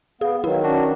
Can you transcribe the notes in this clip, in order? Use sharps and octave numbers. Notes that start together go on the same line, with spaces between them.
B3 G#4 F5
D#3 F#3 E4 B4
C#4 D4 F#4